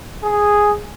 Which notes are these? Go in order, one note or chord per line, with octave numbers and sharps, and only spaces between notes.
G#4